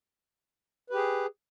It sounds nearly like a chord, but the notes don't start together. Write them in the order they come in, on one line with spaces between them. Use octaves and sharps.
B4 G4 G#4